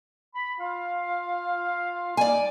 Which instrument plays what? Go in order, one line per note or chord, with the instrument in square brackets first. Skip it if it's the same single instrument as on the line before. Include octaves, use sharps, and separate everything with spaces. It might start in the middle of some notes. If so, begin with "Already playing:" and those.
[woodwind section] B5
F4 F5
[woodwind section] G3 A#3 D#4 [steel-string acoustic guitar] D5 G#5